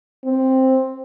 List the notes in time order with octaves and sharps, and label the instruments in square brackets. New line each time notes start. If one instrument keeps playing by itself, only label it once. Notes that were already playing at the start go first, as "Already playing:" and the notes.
[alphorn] C4